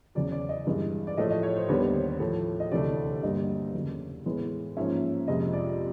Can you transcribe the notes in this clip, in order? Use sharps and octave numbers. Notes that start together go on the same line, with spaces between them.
E2 C#3 F#3 D5
D5
D#5
G2 E3 G#3
D5
A2 F3 A3 D#5
D#5
C#5
C5
D#2 D3 G3 B3 C#5
C5
A2 F3 A3
D#5
D2 C3 E3 A3 D5
G2 D3 G3 A#3 D#5
E2 C#3 F#3
A2 E3 G#3 B3
G#2 F3 A#3 C#4 E5
F2 C3 F3 G#3 D#5
D5